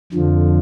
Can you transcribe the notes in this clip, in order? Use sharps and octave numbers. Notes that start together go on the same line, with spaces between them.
F2 D3 F3